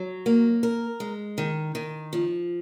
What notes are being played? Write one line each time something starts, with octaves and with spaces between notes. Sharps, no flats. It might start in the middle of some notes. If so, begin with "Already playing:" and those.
Already playing: F#3
A#3
A#4
G#3
D#3
D#3
F3